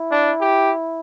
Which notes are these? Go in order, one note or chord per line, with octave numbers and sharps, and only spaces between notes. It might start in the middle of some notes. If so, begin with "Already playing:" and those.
Already playing: E4
D4
G4